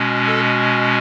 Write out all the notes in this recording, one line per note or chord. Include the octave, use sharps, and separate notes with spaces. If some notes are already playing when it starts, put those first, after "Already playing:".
Already playing: B2 G#3 C#4
A4